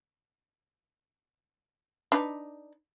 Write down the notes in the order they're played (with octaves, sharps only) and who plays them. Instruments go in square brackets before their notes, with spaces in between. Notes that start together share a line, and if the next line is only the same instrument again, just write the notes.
[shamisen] D4 D#4 B4